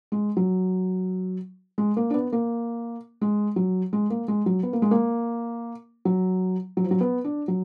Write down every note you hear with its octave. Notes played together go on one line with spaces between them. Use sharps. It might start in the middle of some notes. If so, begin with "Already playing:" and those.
G#3
F#3
G#3
A#3
D4
B3
A#3
G#3
F#3
G#3
A#3
G#3
F#3
B3
A#3
G#3
A#3
F#3
F#3
F3
F#3
B3
D4
F#3